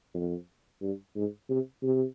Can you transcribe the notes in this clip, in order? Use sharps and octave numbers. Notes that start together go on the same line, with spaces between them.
F2
G2
G#2
C3
C3